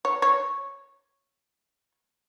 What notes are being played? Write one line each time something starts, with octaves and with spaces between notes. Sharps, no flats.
C#5
C#5